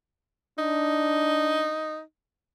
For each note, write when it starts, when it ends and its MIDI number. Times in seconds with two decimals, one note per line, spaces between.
0.58 1.77 62
0.58 2.00 63